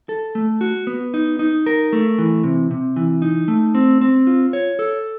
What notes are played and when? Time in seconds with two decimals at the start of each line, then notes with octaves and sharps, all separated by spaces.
0.09 A4
0.35 A3
0.61 F#4
0.87 B3
1.14 D#4
1.39 D#4
1.66 A#4
1.93 A3
2.18 E3
2.44 C3
2.71 C3
2.96 E3
3.22 D#4
3.48 A3
3.75 C4
4.01 C4
4.27 F4
4.53 C#5
4.79 A4